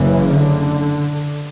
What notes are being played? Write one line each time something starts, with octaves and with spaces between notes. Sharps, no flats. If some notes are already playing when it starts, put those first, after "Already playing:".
Already playing: F#1 F#2 C#3 E3
D3